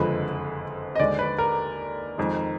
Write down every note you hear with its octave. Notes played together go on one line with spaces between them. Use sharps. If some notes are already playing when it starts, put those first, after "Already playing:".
Already playing: F#1 F2 D3 F3 G#3 B4
D#5
D#2 D3 G#3 D5
B4
A#4
F2 D#3 G#3